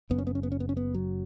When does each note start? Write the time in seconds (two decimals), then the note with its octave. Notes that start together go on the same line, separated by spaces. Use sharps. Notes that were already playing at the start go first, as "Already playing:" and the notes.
0.10 F#1 F#2 C#3 B3
0.18 C#4
0.27 B3
0.35 C#4
0.43 B3
0.52 C#4
0.60 B3
0.69 C#4
0.77 B3
0.94 F#3